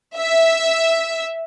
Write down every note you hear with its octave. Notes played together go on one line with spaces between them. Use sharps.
E5